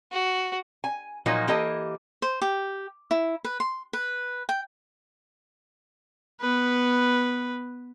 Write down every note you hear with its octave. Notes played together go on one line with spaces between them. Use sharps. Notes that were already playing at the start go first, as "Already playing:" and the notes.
F#4
G#5
A#2 F3 F#3 A#3 D#4
E3 A#3 G4 A4 D#5
C5
G4
E4
B4
C6
B4
G5
B3 B4